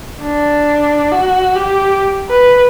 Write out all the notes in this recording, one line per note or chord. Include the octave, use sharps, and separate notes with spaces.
D4
F#4
G4
B4